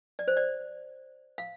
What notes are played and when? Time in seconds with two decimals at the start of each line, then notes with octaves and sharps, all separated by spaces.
0.19 D5
0.28 C5
0.37 D5
1.38 F5